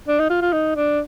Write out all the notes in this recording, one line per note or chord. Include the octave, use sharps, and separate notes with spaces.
D4
D#4
F4
F4
D#4
D4